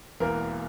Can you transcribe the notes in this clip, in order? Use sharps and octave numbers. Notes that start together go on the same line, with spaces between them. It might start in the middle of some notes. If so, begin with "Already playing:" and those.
E1 E2 E3 A#3 A#4